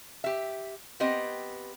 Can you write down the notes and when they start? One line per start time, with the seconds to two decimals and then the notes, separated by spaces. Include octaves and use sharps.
0.24 G4 E5
1.00 B3 C4 G4 D#5